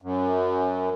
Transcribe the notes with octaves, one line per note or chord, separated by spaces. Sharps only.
F#2